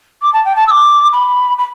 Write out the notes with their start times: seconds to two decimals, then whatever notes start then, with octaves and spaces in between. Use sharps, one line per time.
0.22 D6
0.33 A5
0.45 G5
0.56 A5
0.67 E6
0.71 D6
1.13 B5
1.58 B5